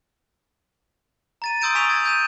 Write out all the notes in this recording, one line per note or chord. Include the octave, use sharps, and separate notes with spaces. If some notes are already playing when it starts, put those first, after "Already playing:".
A#5 A6 D#7
C6 D#6 E6 G6 D7 E7
G#5 C#6 A6 B6 D7 F7
G#6
G6 D#7 E7